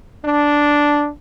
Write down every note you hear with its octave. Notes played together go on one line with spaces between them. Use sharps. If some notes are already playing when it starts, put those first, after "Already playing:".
D4